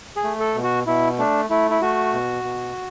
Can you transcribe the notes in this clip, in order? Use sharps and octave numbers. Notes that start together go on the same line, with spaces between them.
G#4
A3
A4
B2
F#4
B2 E4
A3 D4
A3 E4
E4
A3 F#4
B2
B2